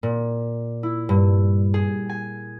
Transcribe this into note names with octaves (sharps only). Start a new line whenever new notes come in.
A#2
E4
G2
G#4
G#5